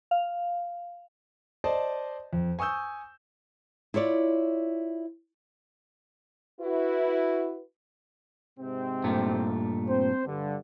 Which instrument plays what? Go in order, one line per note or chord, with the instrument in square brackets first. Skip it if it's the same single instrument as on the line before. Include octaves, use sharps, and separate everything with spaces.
[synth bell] F5
[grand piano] C5 D5 D#5 A5
F2
G#5 C#6 D#6 E6 G6
[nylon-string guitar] E4 F4 C#5 D5
[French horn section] E4 F#4 B4
[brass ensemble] G#2 C3 C4
[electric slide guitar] G2 A#2 A3
[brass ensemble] C4 C5
G2 D3